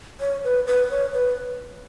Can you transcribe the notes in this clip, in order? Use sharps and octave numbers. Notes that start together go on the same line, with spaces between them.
C#5
B4
B4
C#5
B4